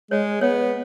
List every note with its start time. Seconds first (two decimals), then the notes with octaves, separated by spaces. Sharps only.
0.11 G#3 C#5
0.41 B3 C#5